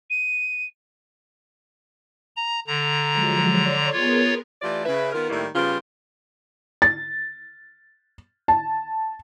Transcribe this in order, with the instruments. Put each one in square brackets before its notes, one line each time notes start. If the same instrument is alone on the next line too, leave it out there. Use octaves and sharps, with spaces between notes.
[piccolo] D#7
[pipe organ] A#5
D3 A#5
[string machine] F3 F#3 G#3
C#5 D5 C6
[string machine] B3 G#4 A#4 [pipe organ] F4 C#5
[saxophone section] E3 A3 F4 G4 D5
C#3 B4 E5
D#3 B3 F4 A#4
A2 D#3 G3 A3 A#3 E4
C#3 G3 B3 F4
[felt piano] A6
A5